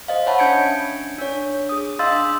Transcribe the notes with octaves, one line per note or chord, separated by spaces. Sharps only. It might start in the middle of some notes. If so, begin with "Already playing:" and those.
C5 D#5 F5
C#5 E5 F#5 A5 B5
C#4 D4 G6 G#6 C#7 D7
D4 C#5
G#4 D#6
D4 D#5 F5 C6 E6 A6